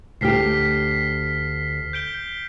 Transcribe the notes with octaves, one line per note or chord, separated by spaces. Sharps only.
D2 G4 F6 B6 C7
G6 D7 G7